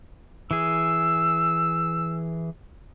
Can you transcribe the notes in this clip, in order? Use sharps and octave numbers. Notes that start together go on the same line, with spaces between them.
E3 G#4 E6